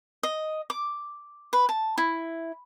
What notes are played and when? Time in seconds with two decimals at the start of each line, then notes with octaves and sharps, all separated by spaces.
0.23 D#5
0.70 D6
1.53 B4
1.69 A5
1.98 E4